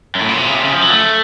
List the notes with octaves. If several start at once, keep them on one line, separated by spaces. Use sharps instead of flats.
F#2
A2
A#2
C3
C#3
C3
C#3
F3
F#3
A3